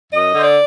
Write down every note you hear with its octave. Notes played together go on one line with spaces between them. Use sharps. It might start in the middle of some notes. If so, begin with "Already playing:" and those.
F#2 D#5
D3 C5
D5